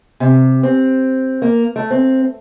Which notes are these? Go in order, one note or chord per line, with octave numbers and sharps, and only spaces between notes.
C3
C4
A#3
A3
C4